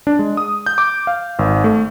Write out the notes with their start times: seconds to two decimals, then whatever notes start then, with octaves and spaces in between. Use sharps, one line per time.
0.07 D4
0.19 G#3
0.37 D#6
0.66 G6
0.78 D6
1.07 F5
1.39 G#1
1.64 A3